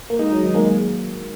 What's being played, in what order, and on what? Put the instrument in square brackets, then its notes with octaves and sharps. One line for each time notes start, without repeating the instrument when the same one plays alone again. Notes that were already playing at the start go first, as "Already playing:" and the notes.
[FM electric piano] A#3
[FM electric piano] G#3 [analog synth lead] D#4
[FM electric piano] F#3
D#3
[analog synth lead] G#3 [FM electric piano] A#3